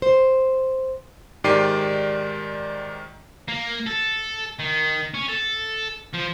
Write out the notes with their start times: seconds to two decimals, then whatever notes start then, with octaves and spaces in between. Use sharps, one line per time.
0.02 C5
1.44 G#2 D#3 G4 D5 C7 D#7
3.49 A#3
3.87 A4
4.59 D#3
5.14 C#4
5.29 A4
6.13 F3